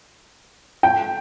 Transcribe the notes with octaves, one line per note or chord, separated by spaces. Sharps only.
G5